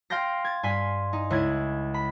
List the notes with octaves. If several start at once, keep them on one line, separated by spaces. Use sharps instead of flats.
F5 G5 C6 G6 A#6
G#6 A6
G2 G#5 C6 B6
D#4
C#2 E4 G#6
B5